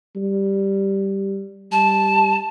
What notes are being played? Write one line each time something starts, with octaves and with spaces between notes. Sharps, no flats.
G3
G3 A5